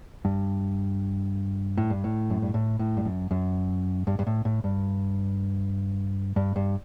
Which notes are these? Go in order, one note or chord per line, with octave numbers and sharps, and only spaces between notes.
G2
A2
G2
A2
F#2
G2
A2
A2
G2
F#2
F#2
G2
G2
A2
A2
G2
G2
G2